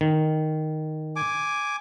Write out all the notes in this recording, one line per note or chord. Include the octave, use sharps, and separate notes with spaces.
D#3
G#5 D6